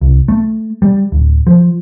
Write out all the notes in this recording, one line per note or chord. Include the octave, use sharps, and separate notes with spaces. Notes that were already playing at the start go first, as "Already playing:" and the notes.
C2
A3
G3
D1
F3